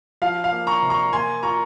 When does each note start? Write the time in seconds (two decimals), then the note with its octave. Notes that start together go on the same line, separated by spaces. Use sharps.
0.22 F3 F5
0.44 F5
0.52 A#3
0.67 A#5 C#6
0.82 C3
0.90 A#5 C#6
1.13 A#3 G#5 C6
1.43 F4 A#5 C#6